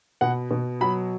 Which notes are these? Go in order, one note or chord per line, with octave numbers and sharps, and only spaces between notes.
B2 F#5
B2
F#3 B5